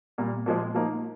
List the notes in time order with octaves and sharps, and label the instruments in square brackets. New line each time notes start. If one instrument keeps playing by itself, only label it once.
[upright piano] A#2 G3 A#3
A#2 F3 G#3
F3 A#3 D#4